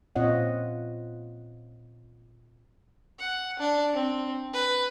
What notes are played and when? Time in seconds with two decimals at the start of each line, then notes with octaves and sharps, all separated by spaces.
0.16 A#2 C4 F4 C#5 D#5 F#5
3.19 F#5
3.59 D4
3.94 C4
4.53 B4